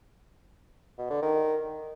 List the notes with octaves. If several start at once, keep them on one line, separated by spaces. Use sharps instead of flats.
B2
D3
D#3